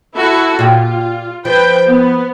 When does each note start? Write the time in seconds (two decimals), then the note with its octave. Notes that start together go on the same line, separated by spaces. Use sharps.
0.15 E4 F#4 A4
0.59 A#2 F4 G4
1.45 F3 B4 G5
1.87 B3